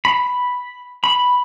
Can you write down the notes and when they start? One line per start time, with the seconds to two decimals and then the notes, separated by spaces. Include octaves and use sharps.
0.05 B5
1.04 B5